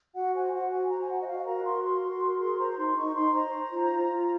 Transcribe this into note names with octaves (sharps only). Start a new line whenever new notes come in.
F#4 F#5
C5 G#5
F#4 F#5
C5 G#5
C5 A#5
G#5
F#4 F#5
D#5
F#4 F5
A#4 A#5
F#4 C6
A#4 C6
F#4
A#4
G#4 C6
C5 A#5
A#5
D#4 C6
D#4 C#6
D#4 C6
C5 A#5
C5
F4
F4
F4